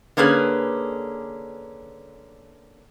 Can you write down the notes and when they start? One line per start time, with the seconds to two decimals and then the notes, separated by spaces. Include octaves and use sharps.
0.17 D3 A#3 C#4 G#4 B4